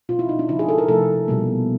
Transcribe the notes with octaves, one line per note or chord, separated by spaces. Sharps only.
B2 G#3 F4
E4
D#4
D4
C#3 F3 A#3 E4
G#4
A4
A#4
C3 F3 A3 A4
B2 G3 A#3